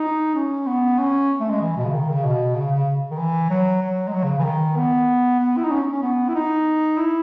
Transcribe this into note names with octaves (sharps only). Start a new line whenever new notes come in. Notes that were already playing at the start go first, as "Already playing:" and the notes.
Already playing: D#4
C#4
B3
C#4
A3
G#3
E3
B2
C#3
D#3
C#3
B2
C#3
C#3
D#3
E3
F#3
F#3
G#3
F#3
C#3
E3
D#3
B3
B3
E4
D#4
C#4
C#4
B3
E4
D#4
E4